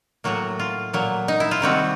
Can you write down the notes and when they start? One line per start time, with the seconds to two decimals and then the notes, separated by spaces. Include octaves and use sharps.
0.24 A2 F#3 A#3 F#4
0.59 F4
0.93 A#2 F#3 A#3
1.28 D#4
1.40 E4
1.51 F4
1.61 C3 D#3 G3 C4 F#4